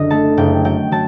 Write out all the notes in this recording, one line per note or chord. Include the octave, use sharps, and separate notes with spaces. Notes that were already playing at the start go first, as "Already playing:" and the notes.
Already playing: F#1 D3 D#5
A3 A5
F#1 G5
F#3 G5
F#3 A5